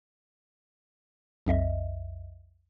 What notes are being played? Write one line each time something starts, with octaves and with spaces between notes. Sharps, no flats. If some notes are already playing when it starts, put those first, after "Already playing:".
B1 F2 D#5 E5